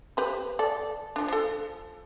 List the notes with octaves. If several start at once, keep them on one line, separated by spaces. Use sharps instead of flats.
G4 B4 C5
A4 D5
F3 D4
F3 A4